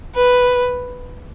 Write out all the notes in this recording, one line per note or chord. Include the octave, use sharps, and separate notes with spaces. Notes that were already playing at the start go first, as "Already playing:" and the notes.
B4